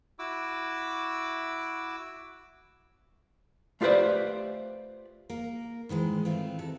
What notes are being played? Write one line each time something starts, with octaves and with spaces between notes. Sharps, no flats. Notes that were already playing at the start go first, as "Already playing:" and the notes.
E4 F#4 D6 E6
A3 F4 G4 B4 C5 D5
A#3 A#4
G#2 D#3 E3 G#3
D#3 E3 A3 C4 E4 F4
C3 A4